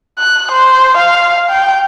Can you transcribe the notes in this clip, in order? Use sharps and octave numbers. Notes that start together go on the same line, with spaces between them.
F#6
C5
F5
G5